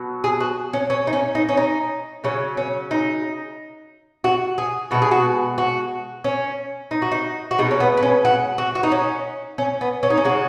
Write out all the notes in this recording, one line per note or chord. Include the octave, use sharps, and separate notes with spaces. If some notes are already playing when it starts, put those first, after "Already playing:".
Already playing: B2 F#3
G#4
F#4
C#4
C#4
D#4
C#4
D#4
C#4
D#4
C#3 F#3 C#4
C#4
D#4
F#4
G#4
B2 G#3 F#4
G#4
F#4
F#4
C#4
D#4
F#4
D#4
F#4
B2 G#3 D#4
C#4
B3
B3
C#4
F#4
F#4
F#4
D#4
C#4
C#4
B3
C#4
D#4
C#4
C#3 G#3 F#4